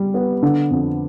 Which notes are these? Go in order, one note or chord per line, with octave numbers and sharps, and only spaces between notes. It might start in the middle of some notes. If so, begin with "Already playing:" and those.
Already playing: G3
B3
D3
F2